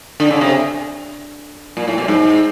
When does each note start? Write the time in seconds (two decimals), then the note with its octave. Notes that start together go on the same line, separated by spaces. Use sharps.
0.20 D3
0.31 C#3
0.41 C3
1.77 A#2
1.88 A2
1.98 B2
2.08 G#2